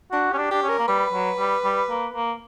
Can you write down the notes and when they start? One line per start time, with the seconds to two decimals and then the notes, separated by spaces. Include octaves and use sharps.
0.12 D4 F#4
0.31 C#4 G4
0.38 D4
0.51 D4 G4
0.63 C#4
0.69 A#4
0.79 A#3
0.88 G3 B4
1.13 F#3
1.39 G3
1.64 G3
1.89 A#3
2.15 A#3